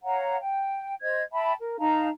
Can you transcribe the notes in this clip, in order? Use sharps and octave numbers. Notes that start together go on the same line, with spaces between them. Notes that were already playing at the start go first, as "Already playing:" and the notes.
C#5 F5 F#5 A#5
G5
C5 D#5 G#6
E5 G5 A5 B5
A#4
D#4 F5 A5 A#5